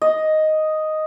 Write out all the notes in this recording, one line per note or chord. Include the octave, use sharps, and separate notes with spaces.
D#5